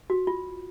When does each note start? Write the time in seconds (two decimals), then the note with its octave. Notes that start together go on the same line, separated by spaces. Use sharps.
0.10 F#4
0.27 F4